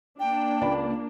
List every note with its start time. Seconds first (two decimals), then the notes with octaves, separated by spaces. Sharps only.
0.20 A#3 D4 G5
0.61 C#2 D5 B5